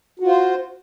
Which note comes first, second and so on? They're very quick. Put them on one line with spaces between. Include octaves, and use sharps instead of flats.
F#4 F4 C5